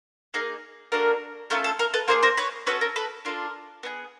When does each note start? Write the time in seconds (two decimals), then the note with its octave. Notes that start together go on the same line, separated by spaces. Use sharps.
0.34 A#3 D#4 G#4 A#4
0.92 A#3 D4 F#4 A4 A#4
1.50 A3 C#4 F4 A4 A#4
1.64 A4
1.79 A#4
1.94 A4 B4
2.08 A#3 D#4 G#4 A#4 C5
2.23 A#4 C5
2.37 B4 C#5
2.67 C#4 F#4 A4 B4 C#5
2.81 A#4
2.96 A4 B4
3.25 D4 F4 A4 A#4
3.83 B3 D#4 G#4